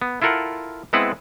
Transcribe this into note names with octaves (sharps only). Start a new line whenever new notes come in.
B3
E4 F4 A4 A#4 F#5
G#3 B3 C4 E4 B4 F#5